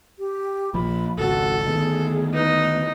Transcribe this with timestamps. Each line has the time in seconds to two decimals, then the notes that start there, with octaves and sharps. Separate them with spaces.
0.19 G4
0.74 A#1 F3 A#3 B5
1.18 G#1 C#2 F#4 A4
1.67 D2 D#3 B3 G#4
2.33 D#4 B4